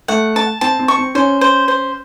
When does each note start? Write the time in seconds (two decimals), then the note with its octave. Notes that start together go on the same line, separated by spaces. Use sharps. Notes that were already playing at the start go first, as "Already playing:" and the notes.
0.08 A3 F#5
0.36 A5
0.61 C4 A5
0.79 C4
0.88 C#6
0.97 C4
1.15 C#4 C5
1.41 C5
1.68 C5